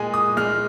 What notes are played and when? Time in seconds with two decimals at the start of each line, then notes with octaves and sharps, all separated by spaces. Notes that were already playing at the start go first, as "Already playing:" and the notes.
Already playing: A#2 G#3 G#5
0.14 D#6
0.37 G#3 F6